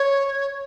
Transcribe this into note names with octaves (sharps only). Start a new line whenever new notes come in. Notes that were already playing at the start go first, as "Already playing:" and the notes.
Already playing: C#5